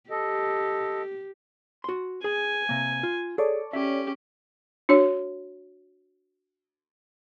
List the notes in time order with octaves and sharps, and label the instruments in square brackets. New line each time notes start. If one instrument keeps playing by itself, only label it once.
[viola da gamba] G4 [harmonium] A4 D#5
[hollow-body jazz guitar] F#4 C6
[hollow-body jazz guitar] G#4 [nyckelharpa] G#5
[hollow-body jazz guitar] C3 A#3
F4
[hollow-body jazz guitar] G#4 [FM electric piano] A4 C#5 D5
[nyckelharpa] C#4 G4 [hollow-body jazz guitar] E5
[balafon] D4 F#4 C#5